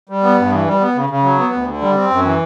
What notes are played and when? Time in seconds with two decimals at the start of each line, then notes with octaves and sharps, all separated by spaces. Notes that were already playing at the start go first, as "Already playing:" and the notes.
0.09 G3
0.23 B3
0.38 G2
0.52 E3
0.66 G3
0.80 B3
0.95 C#3
1.09 C#3
1.24 F#3
1.38 B3
1.53 D2
1.67 D3
1.81 G3
1.96 C4
2.10 F#2
2.25 E3